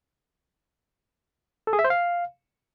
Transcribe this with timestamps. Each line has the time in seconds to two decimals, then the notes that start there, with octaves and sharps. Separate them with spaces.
1.67 A4
1.73 G#4
1.79 E5
1.85 C5
1.90 F5